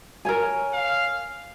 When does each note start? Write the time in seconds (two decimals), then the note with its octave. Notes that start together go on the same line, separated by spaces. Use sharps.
0.25 A#4 C#5 G#5
0.73 F5